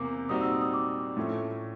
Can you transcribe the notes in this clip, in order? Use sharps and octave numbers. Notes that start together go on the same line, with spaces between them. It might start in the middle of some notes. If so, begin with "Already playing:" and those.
Already playing: E2 C3 A#3 D6
A#2 G3 C4 D#4 F#4 D#6
E6
E6
D#6
D6
A2 F3 A3 C#4